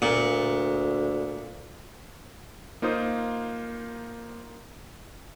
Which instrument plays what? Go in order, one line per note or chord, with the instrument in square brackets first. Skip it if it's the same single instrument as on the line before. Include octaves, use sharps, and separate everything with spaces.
[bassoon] D2 [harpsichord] A#2
[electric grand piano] A#3 D#4 F4 C5 D#6